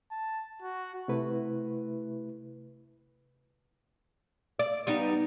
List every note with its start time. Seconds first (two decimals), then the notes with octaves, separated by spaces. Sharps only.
0.11 A5
0.62 F#4
1.08 C3 A3 E4 B4
4.59 D5
4.87 G3 B3 D#4